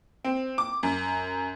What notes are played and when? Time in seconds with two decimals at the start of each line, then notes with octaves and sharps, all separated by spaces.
0.24 C4
0.58 D6
0.83 F#2